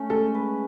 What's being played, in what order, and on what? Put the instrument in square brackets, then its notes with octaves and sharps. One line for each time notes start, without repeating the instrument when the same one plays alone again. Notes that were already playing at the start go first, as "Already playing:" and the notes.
Already playing: [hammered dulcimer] A3 C#4
[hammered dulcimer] G#3 [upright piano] A4
[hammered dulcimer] B4